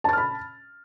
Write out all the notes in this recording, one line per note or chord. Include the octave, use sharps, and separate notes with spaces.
A5 B5 F6 A6